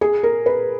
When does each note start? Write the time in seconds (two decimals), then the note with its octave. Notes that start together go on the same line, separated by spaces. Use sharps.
0.01 G#4
0.23 A#4
0.46 B4